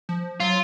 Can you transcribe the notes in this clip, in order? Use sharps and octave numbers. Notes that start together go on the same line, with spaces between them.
F3
F#3 F4